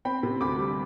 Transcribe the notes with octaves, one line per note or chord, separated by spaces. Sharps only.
C4 G5 B5
C3
D2 B5 D6
G3